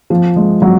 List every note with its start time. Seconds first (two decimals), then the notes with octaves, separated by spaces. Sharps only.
0.10 F3
0.36 G#3
0.62 F#3